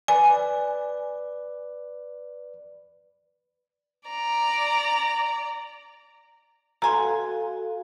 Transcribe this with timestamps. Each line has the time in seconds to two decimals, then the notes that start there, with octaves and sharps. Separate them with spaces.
0.08 B4 D5 G#5
4.09 D5 A#5
6.82 B2 F#4 A4 F5 G#5 A#5 C6